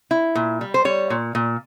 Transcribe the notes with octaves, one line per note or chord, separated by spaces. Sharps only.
E4
A#2
G3
C5
G3 C#5
A#2
A#2